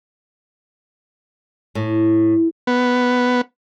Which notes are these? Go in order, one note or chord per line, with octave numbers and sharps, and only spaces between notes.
A2
B3